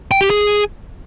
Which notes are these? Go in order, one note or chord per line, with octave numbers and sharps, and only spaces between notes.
G5
G4
G#4